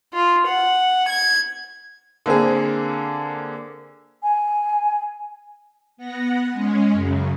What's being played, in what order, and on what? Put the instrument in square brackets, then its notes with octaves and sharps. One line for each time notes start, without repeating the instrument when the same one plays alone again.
[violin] F4
F#5
G#6
[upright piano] D3 A#3 C4 G#4
[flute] G#5
[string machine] B3 F#5 A#6
G#3 C#4
F#2 C#3